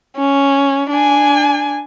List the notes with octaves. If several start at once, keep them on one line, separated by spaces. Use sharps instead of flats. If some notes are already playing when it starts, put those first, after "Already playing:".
C#4
D4 G#5